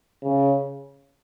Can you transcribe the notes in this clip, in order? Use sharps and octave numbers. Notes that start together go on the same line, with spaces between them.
C#3